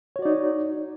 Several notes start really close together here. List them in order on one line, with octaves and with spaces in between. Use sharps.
C#5 F#4 D5 D#4